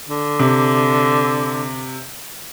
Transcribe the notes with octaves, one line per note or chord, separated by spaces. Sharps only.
D3
C3